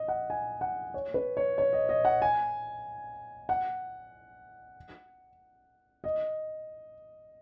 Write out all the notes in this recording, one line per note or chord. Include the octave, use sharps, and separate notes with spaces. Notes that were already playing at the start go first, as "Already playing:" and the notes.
Already playing: D#5
F#5
G#5
F#5
C#5
B4
C#5
C#5
D#5
D#5
F#5
G#5
F#5
D#5